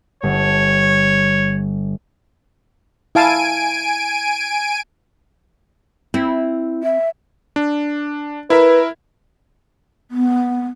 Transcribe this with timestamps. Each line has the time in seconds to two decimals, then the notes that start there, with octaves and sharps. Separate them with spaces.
0.23 G1 C#5
3.15 E4 F5 G#5 A5 D7 D#7
6.14 C4 E4
6.83 E5
7.56 D4
8.50 E4 A#4 B4 E5
10.11 B3